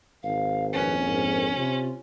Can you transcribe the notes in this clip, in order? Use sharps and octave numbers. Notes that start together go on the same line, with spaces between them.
G#1 F5
A#1 F2 C#4 B4
G#2 A#4
C3 F4